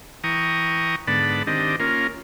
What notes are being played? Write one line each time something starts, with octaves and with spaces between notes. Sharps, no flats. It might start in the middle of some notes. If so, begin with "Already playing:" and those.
E3 G5 A#5 C#6 D#6
G#2 D3 B3 D5 A5 B5
D#3 C4 D4 G4 D#5
A#3 C#4 F4 A#4